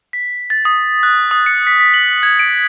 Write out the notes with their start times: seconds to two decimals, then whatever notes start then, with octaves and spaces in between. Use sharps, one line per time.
0.13 B6
0.50 A6
0.65 D#6
1.03 F#6
1.31 D#6
1.46 C#7
1.67 B6
1.80 B6
1.94 F#7
2.23 G#6
2.39 D7